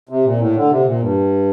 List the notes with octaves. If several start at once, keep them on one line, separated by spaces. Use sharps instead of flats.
C3
A#2
A2
D3
C3
A#2
G2